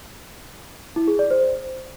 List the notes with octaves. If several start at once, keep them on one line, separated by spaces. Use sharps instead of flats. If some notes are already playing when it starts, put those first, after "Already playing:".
E4
G#4
D5
C5